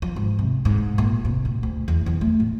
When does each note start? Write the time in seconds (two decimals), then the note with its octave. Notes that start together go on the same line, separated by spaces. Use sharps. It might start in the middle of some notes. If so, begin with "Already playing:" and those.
0.02 F3
0.16 G#2
0.39 C3
0.65 G#2
0.98 A#2
1.25 C3
1.45 D2
1.63 D2
1.88 E2
2.06 E2
2.21 A3
2.40 A2